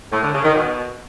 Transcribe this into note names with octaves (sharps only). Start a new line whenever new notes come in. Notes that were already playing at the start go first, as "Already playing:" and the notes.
A2
D3
C#3
D#3
B2